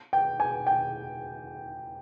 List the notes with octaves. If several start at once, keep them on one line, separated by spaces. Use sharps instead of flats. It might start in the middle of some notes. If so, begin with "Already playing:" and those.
G5
G#5
G5